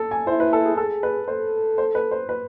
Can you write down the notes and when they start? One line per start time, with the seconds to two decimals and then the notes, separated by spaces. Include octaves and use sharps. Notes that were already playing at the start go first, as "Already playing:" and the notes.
Already playing: A4
0.11 G#5
0.27 E4 C5
0.40 B4
0.53 A4
0.65 G#4
0.77 G#4 A4
1.03 B4
1.28 A4 C5
1.78 C5
1.95 B4
2.11 C5
2.29 B4